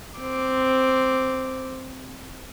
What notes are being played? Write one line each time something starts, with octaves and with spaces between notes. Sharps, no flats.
C4 D6